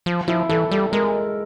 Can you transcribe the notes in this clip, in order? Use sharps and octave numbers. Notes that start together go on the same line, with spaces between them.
F3
F3 E4
E3 A4
G3 A4
G#3 A#4